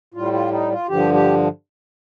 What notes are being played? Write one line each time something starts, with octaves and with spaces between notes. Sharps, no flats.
A2 G3 F4
F4
D#4
F4
G2 D3 F3 G4
G4